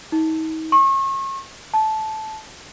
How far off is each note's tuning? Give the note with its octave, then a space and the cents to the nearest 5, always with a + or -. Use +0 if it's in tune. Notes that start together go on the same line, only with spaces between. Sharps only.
D#4 +40
C#6 -35
A5 -15